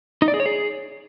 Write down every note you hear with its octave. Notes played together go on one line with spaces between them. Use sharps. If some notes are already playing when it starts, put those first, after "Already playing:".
D#4
D5
G#4
C#5
G#4